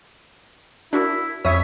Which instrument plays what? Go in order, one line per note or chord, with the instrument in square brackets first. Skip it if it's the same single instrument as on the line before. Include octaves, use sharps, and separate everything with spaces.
[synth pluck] D4 F#4 A#4 [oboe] E4
[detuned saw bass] F2 [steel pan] C#5 E5 [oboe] B5 [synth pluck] D#6